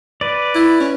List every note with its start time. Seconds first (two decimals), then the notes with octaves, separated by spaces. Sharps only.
0.21 B4 D5
0.55 E4
0.81 C#4